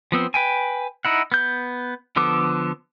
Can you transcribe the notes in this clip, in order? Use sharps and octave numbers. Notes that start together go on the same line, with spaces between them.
F3 B3 C4
B4 G5 G#5
D#4 E4 F#5
B3 G6
D3 F3 B3 A4 D6